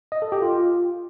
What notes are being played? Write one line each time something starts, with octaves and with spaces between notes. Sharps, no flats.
D#5
A4
G4
F4